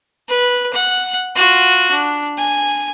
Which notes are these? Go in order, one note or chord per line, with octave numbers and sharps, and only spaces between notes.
B4
F#5
F4 F#4
D4
G#5